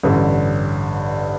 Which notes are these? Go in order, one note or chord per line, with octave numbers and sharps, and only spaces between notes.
A1 G2 D3